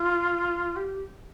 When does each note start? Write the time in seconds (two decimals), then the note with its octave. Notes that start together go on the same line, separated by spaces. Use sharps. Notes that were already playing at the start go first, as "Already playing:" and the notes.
Already playing: F4
0.76 G4